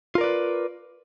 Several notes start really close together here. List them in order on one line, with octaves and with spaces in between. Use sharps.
F4 A#4 D5 B4